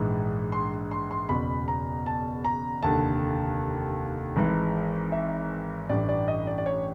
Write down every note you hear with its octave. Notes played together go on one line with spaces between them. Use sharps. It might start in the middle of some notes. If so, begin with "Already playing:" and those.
Already playing: A#1 G#2 E3
C6
C6
C6
F#1 E2 B2 B5
A#5
A5
A#5
F1 D#2 D3 A5
G#1 G#2 E3
E5
A1 G2 E3 D5
D5
D#5
D5
D5
C#5